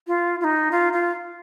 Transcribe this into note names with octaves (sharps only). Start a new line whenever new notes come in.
F4
F4
D#4
F4
F4